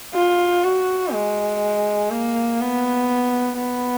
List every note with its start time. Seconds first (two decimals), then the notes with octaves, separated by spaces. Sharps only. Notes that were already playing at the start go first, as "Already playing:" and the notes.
0.15 F4
0.63 F#4
1.13 G#3
2.10 A#3
2.61 B3
3.57 B3